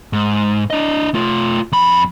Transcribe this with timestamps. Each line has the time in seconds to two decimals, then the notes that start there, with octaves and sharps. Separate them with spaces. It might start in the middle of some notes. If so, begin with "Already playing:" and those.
0.13 G#2
0.70 D4 D#5
1.14 A3 F4
1.72 F2 B5